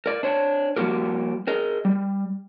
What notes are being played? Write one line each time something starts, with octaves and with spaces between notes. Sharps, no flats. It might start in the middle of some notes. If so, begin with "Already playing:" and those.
A#4 D5
D4 C5 C#5
F3 G3 A#3 F#4 G4 A#4
G#4 A#4 D#5
G3